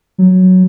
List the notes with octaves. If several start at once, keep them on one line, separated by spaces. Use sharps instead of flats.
F#3